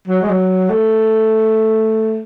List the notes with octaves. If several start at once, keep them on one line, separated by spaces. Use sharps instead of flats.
F#3
G#3
F#3
A3